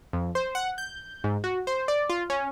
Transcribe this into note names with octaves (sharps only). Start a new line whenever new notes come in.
F2
C5
F#5
G6
G#2
F#4
C5
D5
F4
C#4